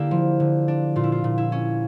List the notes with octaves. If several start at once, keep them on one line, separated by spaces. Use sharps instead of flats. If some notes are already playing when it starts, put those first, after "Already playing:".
Already playing: D3 A#3 D4 E4 G4
F3
D3
D4
A#2 F4
E4
F4
A#2
E4
C#4